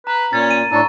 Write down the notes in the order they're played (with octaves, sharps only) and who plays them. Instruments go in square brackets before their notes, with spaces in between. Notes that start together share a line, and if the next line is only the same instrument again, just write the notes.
[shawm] B4 [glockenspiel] A#5
[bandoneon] A#2 [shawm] C#4 [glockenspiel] A6
[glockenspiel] D#7
[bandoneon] A2 D4 [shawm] A4 [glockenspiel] A#5 C#6